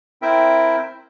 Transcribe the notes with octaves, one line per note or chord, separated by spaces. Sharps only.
C4 E4 A#4 C5 E5 G5